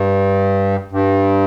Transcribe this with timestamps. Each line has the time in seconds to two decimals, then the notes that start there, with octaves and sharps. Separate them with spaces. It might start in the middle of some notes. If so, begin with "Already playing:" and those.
Already playing: G2
0.92 G2